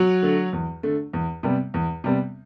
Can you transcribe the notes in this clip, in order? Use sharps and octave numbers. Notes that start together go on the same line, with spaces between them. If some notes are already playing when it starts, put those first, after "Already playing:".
Already playing: F#3 F#4
D3 A3
E2
D3 A3
E2
C3 G3 B3
E2
C3 G3 B3